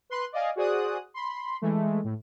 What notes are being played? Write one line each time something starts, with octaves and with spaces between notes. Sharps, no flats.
B4 C6 F#6
D5 D#5 F5 G#5
F#4 G#4 C5 D5 D#6 F#6
B5 C6
E3 G#3 A3
A2